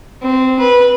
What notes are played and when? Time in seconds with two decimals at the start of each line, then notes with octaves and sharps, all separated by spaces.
0.22 C4
0.59 B4